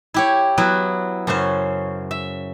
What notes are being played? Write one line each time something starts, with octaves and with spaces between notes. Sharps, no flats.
E4 G4 C#5
F#3 B3 E4
F#2 C#3 C#4 C5
E5